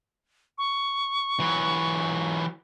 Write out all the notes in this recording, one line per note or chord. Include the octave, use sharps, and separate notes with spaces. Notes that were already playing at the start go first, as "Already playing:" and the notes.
C#6
E3 F#3